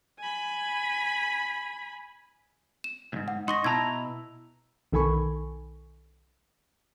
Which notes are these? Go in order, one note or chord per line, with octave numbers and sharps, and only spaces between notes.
G#5 B5
E7
D2 G#2
F#5
D#4 C6 C#6 A#6
B2 E4 A5 A#5 G#6
B1 D#3 A4 G#5 B5 C#6